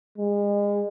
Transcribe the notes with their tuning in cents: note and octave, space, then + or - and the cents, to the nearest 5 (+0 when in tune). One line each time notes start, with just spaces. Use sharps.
G#3 -30